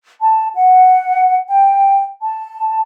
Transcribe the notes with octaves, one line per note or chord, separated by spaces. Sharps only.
A5
F#5
G5
A5